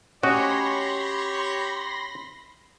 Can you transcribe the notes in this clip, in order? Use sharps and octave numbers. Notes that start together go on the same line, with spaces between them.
C#4 F#4 G4 C#5 D#5 B5 C6 A#6